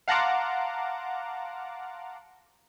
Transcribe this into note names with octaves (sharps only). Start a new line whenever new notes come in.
F5 F#5 A5 A#5 C6 D6